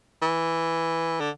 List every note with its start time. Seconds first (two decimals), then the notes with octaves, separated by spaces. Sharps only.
0.22 E3
1.20 D3